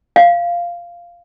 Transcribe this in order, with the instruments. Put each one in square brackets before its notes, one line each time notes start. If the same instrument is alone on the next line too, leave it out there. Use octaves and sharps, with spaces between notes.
[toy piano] F5